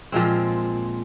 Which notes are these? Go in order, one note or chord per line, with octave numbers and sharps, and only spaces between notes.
A#2 F3 G#3 C4